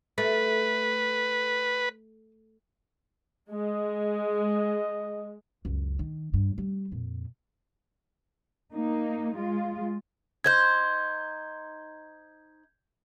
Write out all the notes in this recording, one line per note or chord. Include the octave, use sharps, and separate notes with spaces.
A3 B4
G#3 D#5
C#2 F#2
D#3
G2
G3
F2 A#2
A#3 D#4
G#3 F4
D#4 C5 G6 G#6